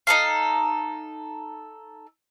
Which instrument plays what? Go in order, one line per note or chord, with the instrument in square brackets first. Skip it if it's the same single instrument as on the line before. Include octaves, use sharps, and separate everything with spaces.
[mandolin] D#4 A4 F5